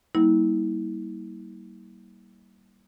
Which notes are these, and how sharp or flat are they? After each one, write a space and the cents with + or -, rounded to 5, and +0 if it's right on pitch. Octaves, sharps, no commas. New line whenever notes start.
G3 -25 A#3 +0 E4 -40